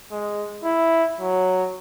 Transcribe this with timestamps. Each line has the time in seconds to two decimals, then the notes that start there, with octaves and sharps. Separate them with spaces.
0.12 G#3
0.64 E4
1.21 F#3